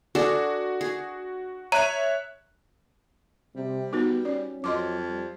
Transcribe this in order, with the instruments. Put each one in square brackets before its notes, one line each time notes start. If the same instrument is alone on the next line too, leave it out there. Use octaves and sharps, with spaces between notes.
[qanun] D4 G#4 A4 [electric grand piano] F#4
[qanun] G#4
[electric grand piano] C#5 E5 F#6 [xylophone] A#5
[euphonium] C3 [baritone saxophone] G3
[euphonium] B3 [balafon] D#4 F#4 B4
[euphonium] C#4 [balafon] D5
[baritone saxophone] F2 [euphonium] F#3 [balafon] D#5 C6 D6
[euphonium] G3